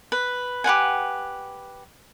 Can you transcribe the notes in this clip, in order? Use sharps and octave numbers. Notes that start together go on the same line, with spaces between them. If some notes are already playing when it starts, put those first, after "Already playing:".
B4
G4 B4 F#5 G#5